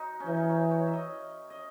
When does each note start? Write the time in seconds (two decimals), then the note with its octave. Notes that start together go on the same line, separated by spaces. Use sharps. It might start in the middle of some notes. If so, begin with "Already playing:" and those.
Already playing: D#4 F#4
0.20 C#4
0.26 E3 D#4
0.49 C#5
0.71 C#5
0.87 E5
0.93 D#5
1.50 D#5